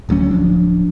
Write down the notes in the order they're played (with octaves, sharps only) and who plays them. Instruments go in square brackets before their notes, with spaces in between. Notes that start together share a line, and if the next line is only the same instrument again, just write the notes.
[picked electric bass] D1 D2 F#3 C#4
D1 F3 D4